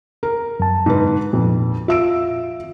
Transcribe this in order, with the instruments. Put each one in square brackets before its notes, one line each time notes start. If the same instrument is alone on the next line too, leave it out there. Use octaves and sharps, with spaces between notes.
[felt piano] A#4
[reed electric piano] F#2 A5
[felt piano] G#2 D3 B4
[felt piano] F2 [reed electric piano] A#2
[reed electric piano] F4 [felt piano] E5 E6 D7